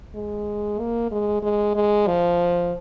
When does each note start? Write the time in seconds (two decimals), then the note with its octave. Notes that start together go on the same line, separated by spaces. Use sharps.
0.15 G#3
0.79 A#3
1.11 G#3
1.42 G#3
1.76 G#3
2.07 F3